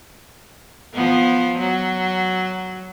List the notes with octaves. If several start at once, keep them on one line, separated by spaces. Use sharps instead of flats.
F3 B3
F#3